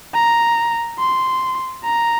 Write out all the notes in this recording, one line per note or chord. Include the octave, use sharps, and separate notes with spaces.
A#5
C6
A#5